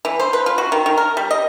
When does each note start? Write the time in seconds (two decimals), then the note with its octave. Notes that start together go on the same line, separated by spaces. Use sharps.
0.05 E3
0.20 C5
0.33 B4
0.46 F4
0.58 F#4
0.72 D#3
0.86 D#3
0.97 A#4
1.17 G3
1.31 D#5